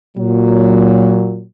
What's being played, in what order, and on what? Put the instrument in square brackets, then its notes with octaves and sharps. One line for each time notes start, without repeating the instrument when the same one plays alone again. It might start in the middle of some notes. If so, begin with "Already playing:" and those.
[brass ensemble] A#2 F#3